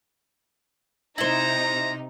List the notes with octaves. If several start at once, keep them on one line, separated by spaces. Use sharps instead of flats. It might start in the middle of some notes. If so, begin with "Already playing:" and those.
C3 D#4 E4 C5 A#5